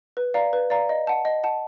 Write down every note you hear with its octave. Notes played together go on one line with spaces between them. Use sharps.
B4
D5 F5 A#5
B4
D5 F5 A#5
D#5
F#5 A5
D#5
F#5 A5